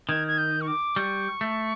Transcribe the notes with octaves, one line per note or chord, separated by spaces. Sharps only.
D#3 G#6
G#6
G6
C#6
D6
G3 C#6
A3